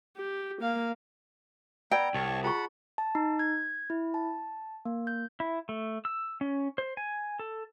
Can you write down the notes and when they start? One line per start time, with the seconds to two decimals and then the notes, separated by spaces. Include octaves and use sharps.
0.17 G4
0.62 A#3 F5
1.91 B3 D5 G5 A#5 E6
2.14 C2 C#5 A5 C#6
2.44 F4 G#4 F#5 A5 B5 C#6
2.98 A5
3.15 D#4
3.39 G#6
3.90 E4
4.14 A5
4.85 A#3
5.07 G6
5.40 E4
5.69 A3
6.05 E6
6.41 C#4
6.78 C5
6.97 G#5
7.39 A4